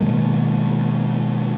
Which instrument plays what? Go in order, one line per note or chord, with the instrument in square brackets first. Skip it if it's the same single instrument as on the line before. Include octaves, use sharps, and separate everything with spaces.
[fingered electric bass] B2 D#3 G#3 A#3